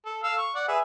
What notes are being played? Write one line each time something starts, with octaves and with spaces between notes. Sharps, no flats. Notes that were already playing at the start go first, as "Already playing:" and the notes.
A4
A4 F5 E6
C#6
D5 F#5
G#4 B4 E5